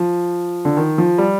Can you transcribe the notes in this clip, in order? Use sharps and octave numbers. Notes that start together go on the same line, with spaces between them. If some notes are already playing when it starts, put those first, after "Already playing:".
Already playing: F3
D3
D#3
F3
G3